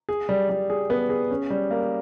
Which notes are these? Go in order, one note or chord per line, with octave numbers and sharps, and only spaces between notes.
G#4
G3
G3
G#4
B3
G#4
C#4
G3
A#3